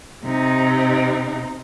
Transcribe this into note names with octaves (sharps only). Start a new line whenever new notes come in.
C3 D#4